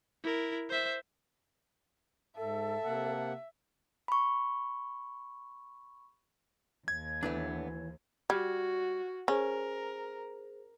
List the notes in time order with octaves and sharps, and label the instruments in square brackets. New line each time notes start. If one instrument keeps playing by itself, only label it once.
[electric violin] E4 A#4
C5 E5
[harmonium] G#2 [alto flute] A4 [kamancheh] E5 [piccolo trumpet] A5
[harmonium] C3 A#3 F#5
[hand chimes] B5 C#6
[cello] D#2 [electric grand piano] G#6
[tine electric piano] E3 [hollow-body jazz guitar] A3 B3 D4
[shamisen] G3 [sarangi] F#4 [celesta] F6 G#6
[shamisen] C#4 [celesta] G#4 C5 [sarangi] A#4